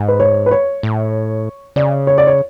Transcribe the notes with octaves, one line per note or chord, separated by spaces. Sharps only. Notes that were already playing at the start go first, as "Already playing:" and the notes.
Already playing: G#2
B4
C#5
B4
C#5
A2
C#3 D5
C#5
D5
C#5